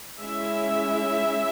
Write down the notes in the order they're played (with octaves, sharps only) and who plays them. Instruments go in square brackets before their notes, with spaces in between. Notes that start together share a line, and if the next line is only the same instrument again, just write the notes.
[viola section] G#3 C#4 E4 E5